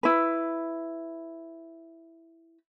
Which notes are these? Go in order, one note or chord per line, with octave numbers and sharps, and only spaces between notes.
E4 B4